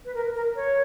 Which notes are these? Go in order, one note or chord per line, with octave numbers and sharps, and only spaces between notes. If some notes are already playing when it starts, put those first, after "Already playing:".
B4
A#4
A#4
C#5